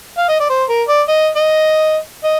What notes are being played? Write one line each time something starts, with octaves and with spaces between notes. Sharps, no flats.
F5
D#5
D5
C5
A#4
D5
D#5
D#5
D#5